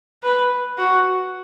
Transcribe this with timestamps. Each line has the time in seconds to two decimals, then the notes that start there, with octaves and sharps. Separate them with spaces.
0.23 B4
0.78 F#4